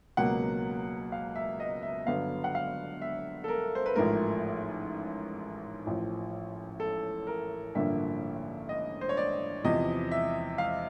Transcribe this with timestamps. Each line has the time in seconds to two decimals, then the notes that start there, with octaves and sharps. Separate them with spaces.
0.17 C#2 B2 F#3 A#3 F#5
1.12 F5
1.35 E5
1.60 D#5
1.83 E5
2.07 G1 G2 D3 F#3 B3 F5
2.44 F#5
2.55 F5
3.02 E5
3.44 A4
3.48 A#4
3.75 C5
3.86 B4
3.96 A1 G#2 F3 A3 A#4
5.86 A1 A2 F3
6.80 A4
7.27 A#4
7.75 A1 G2 D3 F3 A#3 E5
8.69 D#5
9.01 C5
9.09 C#5
9.17 D5
9.64 E2 C3 F3 D#5
10.11 E5
10.58 F5